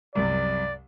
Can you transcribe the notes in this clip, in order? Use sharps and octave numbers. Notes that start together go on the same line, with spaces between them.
C2 F#2 C3 D5